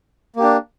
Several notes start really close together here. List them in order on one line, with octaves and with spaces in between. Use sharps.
A#3 G4 D4